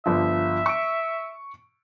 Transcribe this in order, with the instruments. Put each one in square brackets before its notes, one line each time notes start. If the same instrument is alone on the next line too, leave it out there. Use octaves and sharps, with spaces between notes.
[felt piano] G1 F3 [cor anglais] E5
[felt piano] C#6 D7